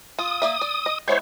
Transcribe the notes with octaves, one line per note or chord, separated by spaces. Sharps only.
F4 D#6
A#3 D5 E5
D5
D#5
G#3 B3 E4 C5 C#5